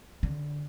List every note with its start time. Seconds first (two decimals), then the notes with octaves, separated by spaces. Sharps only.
0.23 D3